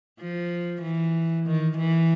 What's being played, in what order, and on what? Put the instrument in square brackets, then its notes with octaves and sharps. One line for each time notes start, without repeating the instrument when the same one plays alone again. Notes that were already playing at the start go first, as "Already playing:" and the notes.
[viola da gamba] F3
E3
D#3
E3